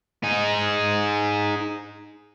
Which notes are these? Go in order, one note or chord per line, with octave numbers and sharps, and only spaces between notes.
D#4 G#4